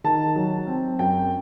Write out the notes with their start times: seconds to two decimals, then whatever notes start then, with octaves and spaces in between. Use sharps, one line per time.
0.04 D#3 A5
0.36 F#3
0.67 C4
0.99 F#2 G5